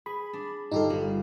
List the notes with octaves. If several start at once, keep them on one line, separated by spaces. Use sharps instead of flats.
G#4 B5
D4
G2 D3 D#4 F4 G4 A4
G1 G3